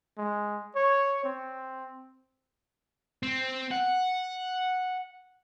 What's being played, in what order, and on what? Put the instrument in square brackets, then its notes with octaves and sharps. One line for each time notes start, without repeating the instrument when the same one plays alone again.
[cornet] G#3
C#5
C4
[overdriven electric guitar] C4
F#5